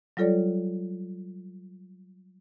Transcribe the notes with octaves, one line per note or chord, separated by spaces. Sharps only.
F#3 G3 F4 A4 C#5 D5